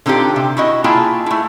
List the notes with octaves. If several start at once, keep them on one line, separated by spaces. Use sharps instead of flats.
D3 C4 D#4 F4 G4
C3
E4 F#4 D#5
A#3 E4 F4 G#4 G5 A5
A3 E4